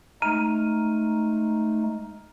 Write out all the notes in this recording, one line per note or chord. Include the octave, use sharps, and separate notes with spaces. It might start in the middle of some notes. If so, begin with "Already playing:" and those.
G#3 A3 D#4 A#5 F6 D#7